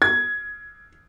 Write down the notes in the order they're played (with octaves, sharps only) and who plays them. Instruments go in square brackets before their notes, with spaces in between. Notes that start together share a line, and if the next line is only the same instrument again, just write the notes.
[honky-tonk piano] G#6